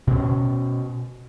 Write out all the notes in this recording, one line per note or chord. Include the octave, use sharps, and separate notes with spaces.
B2 C#4